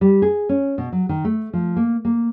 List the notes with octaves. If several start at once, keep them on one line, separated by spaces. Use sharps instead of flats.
G3
G#4
C#4
B2
F#3
D#3
A3
F3
A#3
A#3